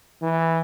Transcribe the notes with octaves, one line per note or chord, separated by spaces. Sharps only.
E3